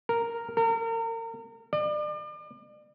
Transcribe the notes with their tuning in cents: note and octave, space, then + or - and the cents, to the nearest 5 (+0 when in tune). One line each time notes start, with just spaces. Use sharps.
A#4 -5
A#4 -35
D5 +40